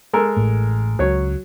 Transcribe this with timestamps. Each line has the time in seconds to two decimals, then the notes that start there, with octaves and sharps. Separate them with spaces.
0.13 G#3 A4 A#4
0.36 A1 A2
0.99 C#2 F#3 C#5